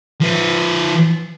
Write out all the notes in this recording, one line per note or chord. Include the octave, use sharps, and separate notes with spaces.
F3 B4